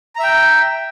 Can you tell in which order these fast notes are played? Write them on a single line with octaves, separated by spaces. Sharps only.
A#5 E5 G5